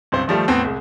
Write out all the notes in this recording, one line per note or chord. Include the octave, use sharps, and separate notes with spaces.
C#2 G2 C3 C5
D#3 F3 G3 A3
E2 A2 B3 C4
C2 G#3